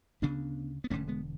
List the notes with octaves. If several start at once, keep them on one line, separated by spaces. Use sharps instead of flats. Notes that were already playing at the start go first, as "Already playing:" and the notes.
D2 C#3 B3 D4
B3
E1 E2 D3 A3 C#4
G#3 B3